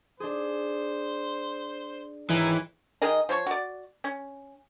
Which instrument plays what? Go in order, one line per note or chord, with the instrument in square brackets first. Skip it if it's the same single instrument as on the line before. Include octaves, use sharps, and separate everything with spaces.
[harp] D4 G#4 [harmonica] C5
[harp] G#1 C#5 G5 [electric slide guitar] E3 [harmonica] A#4 G#5
[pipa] D#3 G#4 A#4 D#5
F3 C5 C#5 C#6
F#4 D5
C#4